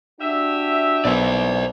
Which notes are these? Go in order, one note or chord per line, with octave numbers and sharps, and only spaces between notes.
D4 F#4 G4 E5
B1 B3 C5 D5